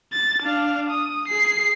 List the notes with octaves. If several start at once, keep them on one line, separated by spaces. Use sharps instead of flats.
A6
D4 F5
D#6
G#4 C7